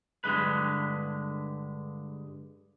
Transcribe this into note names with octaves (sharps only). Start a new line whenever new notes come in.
G2 D3 G#3 B4